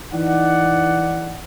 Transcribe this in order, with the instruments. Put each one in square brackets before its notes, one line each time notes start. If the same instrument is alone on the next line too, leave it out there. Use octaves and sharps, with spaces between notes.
[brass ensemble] E3 D#4 D5 F#5